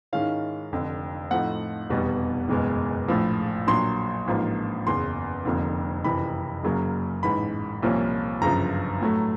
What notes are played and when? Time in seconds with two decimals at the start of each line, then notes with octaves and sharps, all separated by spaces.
0.13 G#2 D#3 G#3 C#4 E4 F5
0.72 F1 F2 D3
1.31 A2 F3 A3 C4 D#4 F#5
1.90 F1 E2 B2 G3 B3
2.49 F#1 E2 B2 G#3
3.08 A#1 A2 F3
3.67 A#1 A#2 F#3 C6
4.27 A1 G#2 F3 A#3
4.86 F#1 E2 C#3 C6
5.45 F1 F2 D3 F3 A#3
6.04 F#1 F2 C3 E3 B5
6.63 F#1 F#2 C#3 F#3 A#3
7.23 A1 G#2 E3 B5
7.82 C2 A#2 F3 A#3 C#4
8.42 G1 F#2 C#3 F3 A#5
9.01 A2 F#3 A3